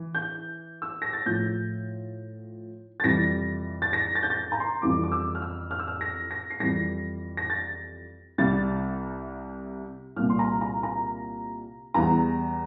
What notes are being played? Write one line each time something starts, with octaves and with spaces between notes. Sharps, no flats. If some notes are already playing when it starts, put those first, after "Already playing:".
Already playing: E3
G6
E6
A#6
A6
A2 F3 G6
A6
F2 C3 E3 G3 A#6
A6
A#6
A6
G6
A6
A#5
C6
F2 E3 G3 D6
D6
E6
F6
E6
F6
E6
F6
A#6
A#6
C7
F2 E3 G3 A#6
A#6
A6
C2 C3 G3 A6
C2 A#2 G3 F6
C6
A#5
A#5
A#5
E2 E3 G3 A#5